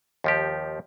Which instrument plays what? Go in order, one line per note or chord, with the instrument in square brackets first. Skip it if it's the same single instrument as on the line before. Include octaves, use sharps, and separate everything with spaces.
[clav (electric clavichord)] D#2 F3 G4